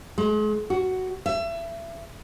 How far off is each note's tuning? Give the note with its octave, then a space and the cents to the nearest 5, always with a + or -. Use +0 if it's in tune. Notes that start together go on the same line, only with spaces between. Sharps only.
G#3 +40
F#4 +10
E5 +30